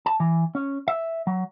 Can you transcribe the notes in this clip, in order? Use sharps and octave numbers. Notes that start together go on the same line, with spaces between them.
A5
E3
C#4
E5
F#3